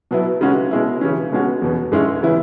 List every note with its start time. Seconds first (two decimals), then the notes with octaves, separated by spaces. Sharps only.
0.11 B2 F#3 B3 E4
0.41 C#3 G#3 C#4 F#4
0.71 B2 G#3 E4
1.01 C#3 E3 C#4
1.32 B2 G#3 C#4 F#4
1.62 E2 B2 B3
1.92 G#2 G#3 C#4 E4
2.23 C#3 E3 B3 E4